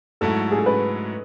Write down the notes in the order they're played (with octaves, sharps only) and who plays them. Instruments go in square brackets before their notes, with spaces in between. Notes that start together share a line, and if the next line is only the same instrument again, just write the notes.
[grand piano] G#2 F#3 A3 E4 [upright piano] A4
[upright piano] G#4
A4
B4